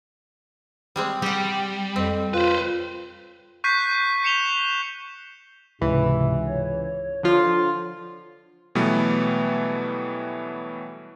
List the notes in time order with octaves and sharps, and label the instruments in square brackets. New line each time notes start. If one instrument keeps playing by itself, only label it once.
[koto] G3 G#3 C4
[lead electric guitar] G3 [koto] G4 F#5
[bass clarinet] F2 [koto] C4
[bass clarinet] F4 [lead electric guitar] B4 C5
[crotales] C#6 F#6 G6 B6 C7 D#7
B6 C#7 E7 F7 G7
[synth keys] C#2 E3 [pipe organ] G#2 C3
[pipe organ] C#5
[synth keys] D3 F3 F4
[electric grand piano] B2 E3 F#3 G3 A3 B3